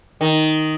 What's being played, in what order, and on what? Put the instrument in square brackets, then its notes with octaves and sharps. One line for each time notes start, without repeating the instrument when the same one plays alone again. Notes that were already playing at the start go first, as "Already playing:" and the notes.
[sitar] D#3